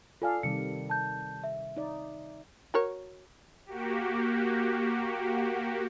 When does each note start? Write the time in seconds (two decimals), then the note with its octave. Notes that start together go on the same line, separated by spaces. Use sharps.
0.22 F4 A4 D5 F5 G#5 F6
0.43 C3 D#3 G3 C#7
0.90 A5 G6
1.44 E5
1.77 D#4 D5
2.74 F#4 A#4 C#5
3.66 A#3 F#4 G4